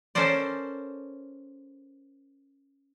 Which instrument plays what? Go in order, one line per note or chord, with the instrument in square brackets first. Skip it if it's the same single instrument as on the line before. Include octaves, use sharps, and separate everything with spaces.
[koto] C#4 A4 A#4 C5 D5